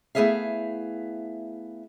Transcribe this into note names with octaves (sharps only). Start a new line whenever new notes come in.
A3 B3 E4 G#4 E5 F5